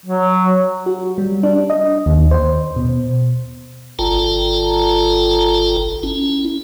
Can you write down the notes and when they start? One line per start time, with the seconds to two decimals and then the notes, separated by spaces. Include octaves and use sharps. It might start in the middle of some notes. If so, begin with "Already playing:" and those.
0.06 F#3
0.86 F#4
1.18 G3
1.43 D4
1.70 D#5
2.06 D#2
2.31 C5
2.76 B2
3.99 G1 F4 A4 G5 A5 A#5
6.03 C#4 E4